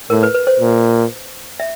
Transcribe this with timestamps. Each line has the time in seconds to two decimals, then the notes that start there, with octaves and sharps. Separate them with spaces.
0.10 A2 A#4
0.23 B4
0.34 B4
0.47 C5
0.60 A#2
1.60 E5